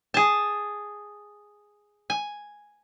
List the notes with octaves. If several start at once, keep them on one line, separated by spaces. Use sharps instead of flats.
G#4 A5
G#5